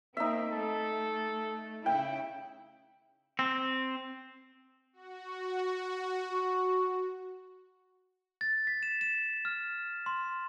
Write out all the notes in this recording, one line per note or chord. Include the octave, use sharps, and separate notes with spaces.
A#3 C4 D#4 E5
A3 A4
C#3 E4 G5
C4
F#4
F#4
A6
B6
E7
E7
F6
C6